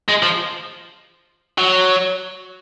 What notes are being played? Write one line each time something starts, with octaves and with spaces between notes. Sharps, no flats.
G#3
F3
F#3